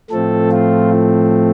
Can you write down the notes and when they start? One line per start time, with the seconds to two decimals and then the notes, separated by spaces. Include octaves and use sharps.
0.10 A2 F3 A3 C4 A4
0.52 F4